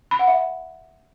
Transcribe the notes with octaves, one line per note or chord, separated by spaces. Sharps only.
B5
F#5
E5